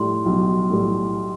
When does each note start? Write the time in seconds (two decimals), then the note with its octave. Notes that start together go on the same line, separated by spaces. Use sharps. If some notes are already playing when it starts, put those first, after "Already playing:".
Already playing: A2 G3 C6
0.26 B1
0.70 A2 G3